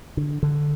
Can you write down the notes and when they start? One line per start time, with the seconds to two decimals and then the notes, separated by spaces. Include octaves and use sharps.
0.17 D3
0.43 D3